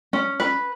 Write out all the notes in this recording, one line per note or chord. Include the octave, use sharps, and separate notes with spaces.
C#4
B4